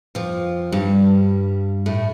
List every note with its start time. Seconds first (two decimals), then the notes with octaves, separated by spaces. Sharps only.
0.15 F2 F3
0.72 G2 G3
1.86 A2 A3